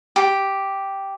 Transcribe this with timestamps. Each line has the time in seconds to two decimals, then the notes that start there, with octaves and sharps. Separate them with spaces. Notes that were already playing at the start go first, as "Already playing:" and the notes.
0.16 G4